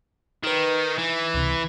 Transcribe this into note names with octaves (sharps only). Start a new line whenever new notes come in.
D#3 D#4 B4
E3
C#2 C3